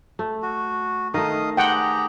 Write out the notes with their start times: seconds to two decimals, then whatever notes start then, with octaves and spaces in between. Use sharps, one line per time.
0.19 A3
0.43 F#4
1.14 D#3 A3 D#5 F5 D#6
1.57 G4 G#4 F#5 G5 A#5